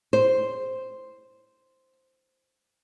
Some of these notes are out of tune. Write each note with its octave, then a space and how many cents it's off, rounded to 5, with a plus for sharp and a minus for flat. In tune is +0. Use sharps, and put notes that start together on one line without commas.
C5 +0